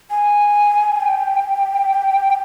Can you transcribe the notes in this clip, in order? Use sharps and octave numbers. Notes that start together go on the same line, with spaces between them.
G#5
G5